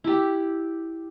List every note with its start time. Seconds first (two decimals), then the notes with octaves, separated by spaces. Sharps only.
0.04 E4 G4